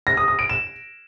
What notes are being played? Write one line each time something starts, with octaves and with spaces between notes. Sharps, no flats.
A#6
D#6
D#6
D7
E7